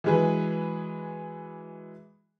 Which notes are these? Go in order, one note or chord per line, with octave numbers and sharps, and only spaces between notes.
E3 F#3 G#3 G#4 B4